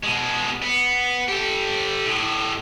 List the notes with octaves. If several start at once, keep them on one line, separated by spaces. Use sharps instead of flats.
B2 G#3
B3
G4 A4
A2 G#3